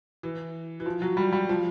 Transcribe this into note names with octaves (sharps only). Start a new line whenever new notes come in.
E3
E3
F3
F#3
G3
G3
F3